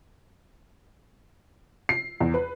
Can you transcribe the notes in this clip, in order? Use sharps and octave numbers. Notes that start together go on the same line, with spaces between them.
C7
E2
B4